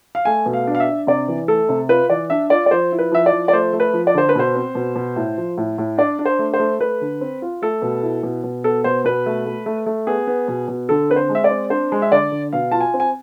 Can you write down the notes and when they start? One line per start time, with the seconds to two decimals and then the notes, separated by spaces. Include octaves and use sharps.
0.15 F5
0.25 A3 G#5
0.46 B2
0.53 F5
0.67 D4
0.75 F5
0.80 E5
0.88 D4
1.07 C3 D5
1.28 E3
1.48 A3 A4
1.69 C3
1.89 F4 B4
2.09 E3 D5
2.30 D4 E5
2.50 F4 D5
2.66 D5
2.71 F3 C5
2.92 E4
2.99 B4
3.12 F3 E5
3.26 D5
3.32 F3
3.48 D5
3.53 A3 C5
3.73 A3
3.80 B4
3.93 F3
4.07 D5
4.14 D3 C5
4.29 B4
4.35 B2 C5
4.55 C4
4.75 B2
4.96 B2
5.16 A2
5.38 F3
5.57 A2
5.78 A2
5.98 D4 D5
6.19 D4
6.25 C5
6.39 A3
6.54 C5
6.59 A3
6.80 A3 B4
7.01 D3
7.21 C4
7.42 F4
7.62 A3 A4
7.82 B2
8.03 E4
8.23 B2
8.44 B2
8.64 B3 A4
8.84 B2 C5
9.04 B2 B4
9.26 A3
9.46 A3
9.66 A3
9.86 A3
10.07 B3 G#4
10.27 B3
10.48 B2
10.68 B2
10.89 D3 A4
11.10 C4 B4
11.16 C5
11.29 G#3
11.35 E5
11.44 D5
11.50 C4
11.70 D4 C5
11.92 G#3
12.02 E5
12.11 D3 D5
12.32 D3
12.53 B2 F5
12.72 F4 A5
12.81 G#5
12.94 C4
13.00 G#5